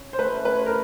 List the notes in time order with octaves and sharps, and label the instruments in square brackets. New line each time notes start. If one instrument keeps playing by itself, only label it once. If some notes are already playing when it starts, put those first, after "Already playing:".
Already playing: [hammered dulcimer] C#4
[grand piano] C5
[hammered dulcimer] A3 [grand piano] B4
[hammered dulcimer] E4 [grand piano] B4
[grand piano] A#4